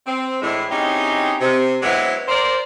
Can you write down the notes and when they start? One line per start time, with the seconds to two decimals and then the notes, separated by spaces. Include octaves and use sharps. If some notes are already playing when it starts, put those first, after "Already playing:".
0.07 C4
0.42 A2 E3 G#3 D4 E4
0.70 C4 C#4 D#4 E4 G4 G#4
1.41 C3
1.82 F#3 G#3 B3 C4 D4 E4
2.28 A#4 C5 D5